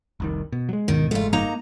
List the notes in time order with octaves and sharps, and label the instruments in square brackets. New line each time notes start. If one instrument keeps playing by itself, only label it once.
[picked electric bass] F1 C2 D#3
B2
F#3 G#3
[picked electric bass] D2 G#2 B2 [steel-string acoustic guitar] D#3
[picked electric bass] F#1 G#2 G#3 [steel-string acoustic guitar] A3 F4
[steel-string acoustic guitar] A#3 D#4 A#5